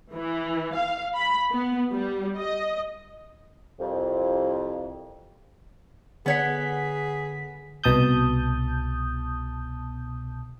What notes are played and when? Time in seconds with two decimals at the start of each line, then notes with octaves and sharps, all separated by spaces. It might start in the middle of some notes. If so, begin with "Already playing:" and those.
0.13 E3
0.75 F5
1.15 B5
1.51 B3
1.91 G3
2.37 D#5
3.80 C2 F2
6.26 D3 B3 G#4 C#5 F#5 B6
7.84 C2 B2 A5 D#6 G6